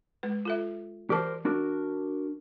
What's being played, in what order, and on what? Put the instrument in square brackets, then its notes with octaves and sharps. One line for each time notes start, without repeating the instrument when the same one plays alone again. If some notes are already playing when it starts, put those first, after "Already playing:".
[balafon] G#3 B4
F4 A4 E5
[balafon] E3 A5 [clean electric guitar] G4 A#4 C5
[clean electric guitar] D4 F#4 A#4